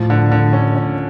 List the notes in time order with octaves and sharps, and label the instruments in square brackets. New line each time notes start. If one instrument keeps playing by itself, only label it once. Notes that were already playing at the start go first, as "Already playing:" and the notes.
Already playing: [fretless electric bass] A2 [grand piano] F3
[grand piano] D3
D3
C#4
C#4